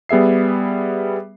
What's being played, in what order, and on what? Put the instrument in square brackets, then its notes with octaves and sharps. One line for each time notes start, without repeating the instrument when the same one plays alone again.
[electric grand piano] G3 B3 G#4 E5 C7